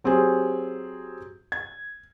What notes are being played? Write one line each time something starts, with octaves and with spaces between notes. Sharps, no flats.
F#3 C4 G4 G#4
G#6